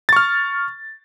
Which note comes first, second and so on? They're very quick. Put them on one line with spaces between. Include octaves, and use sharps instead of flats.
A6 C#6 F6